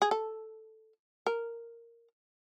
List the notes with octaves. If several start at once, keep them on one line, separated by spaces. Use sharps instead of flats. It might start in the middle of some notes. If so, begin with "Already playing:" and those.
G#4
A4
A#4